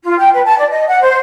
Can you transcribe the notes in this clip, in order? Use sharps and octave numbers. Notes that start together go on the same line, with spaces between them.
F4
G5
B4
A5
D5
D#5
F#5
C5